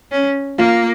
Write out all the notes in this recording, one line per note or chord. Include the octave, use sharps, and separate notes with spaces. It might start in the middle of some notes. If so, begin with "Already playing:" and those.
C#4
A#3 F4